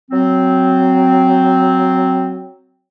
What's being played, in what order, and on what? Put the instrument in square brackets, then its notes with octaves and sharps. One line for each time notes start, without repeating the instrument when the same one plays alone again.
[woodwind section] F#3 C4